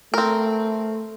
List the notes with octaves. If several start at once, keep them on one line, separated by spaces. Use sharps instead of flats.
A3 C4 A#4